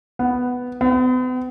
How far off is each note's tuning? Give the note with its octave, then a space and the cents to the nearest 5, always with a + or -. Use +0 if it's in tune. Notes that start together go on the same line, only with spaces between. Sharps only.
B3 +5
B3 +45